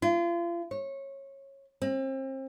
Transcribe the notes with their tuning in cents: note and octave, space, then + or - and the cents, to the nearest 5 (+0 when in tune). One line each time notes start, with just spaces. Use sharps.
F4 -35
C#5 -20
C4 +35